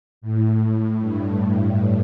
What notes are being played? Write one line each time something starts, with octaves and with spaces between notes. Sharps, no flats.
A2
G2